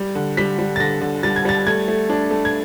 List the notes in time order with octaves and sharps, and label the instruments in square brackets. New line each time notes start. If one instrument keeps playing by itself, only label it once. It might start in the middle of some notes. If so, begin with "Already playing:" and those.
Already playing: [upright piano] G3
D3
G3 B6
G3
A6
D3 A#6
D3
G3 A6
G#6
G3 A6
A3 G#6
A3
D4
A3
G#6